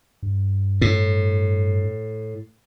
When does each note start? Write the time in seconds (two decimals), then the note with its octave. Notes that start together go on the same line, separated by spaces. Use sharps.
0.23 G2
0.81 A2